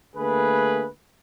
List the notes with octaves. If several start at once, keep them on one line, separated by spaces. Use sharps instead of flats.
D3 A3 A#3 G#4 B4